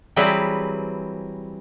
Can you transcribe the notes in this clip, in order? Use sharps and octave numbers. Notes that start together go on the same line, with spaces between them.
E3 F#3 G3 C4 G#4 B4